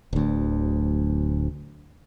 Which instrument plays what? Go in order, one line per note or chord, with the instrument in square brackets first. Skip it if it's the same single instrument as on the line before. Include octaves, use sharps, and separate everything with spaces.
[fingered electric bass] D1 D2